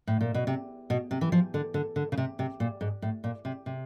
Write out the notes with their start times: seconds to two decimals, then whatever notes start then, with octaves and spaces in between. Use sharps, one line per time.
0.07 A2
0.21 A#2
0.34 B2
0.47 C3
0.90 B2
1.11 C3
1.21 E3
1.32 F3
1.54 D3
1.74 D3
1.96 D3
2.12 C#3
2.18 C3
2.39 C3
2.60 A#2
2.81 G#2
3.02 A2
3.24 A#2
3.45 C3
3.66 C3